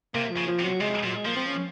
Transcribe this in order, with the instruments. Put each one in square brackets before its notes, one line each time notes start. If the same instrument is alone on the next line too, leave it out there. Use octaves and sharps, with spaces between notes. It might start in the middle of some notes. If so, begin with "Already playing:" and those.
[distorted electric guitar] C3 [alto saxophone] A#3
[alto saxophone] F3
[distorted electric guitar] C#3
[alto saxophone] F3
[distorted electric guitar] C3
[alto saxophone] F#3
[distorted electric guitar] C3 [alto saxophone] G#3
[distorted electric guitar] A#2 [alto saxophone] F#3
[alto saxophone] G#3
[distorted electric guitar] F3 [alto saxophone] A#3
[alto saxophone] C4
C#4